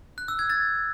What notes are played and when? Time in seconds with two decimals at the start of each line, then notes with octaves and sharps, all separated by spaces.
0.18 F#6
0.28 E6
0.39 G#6
0.50 A6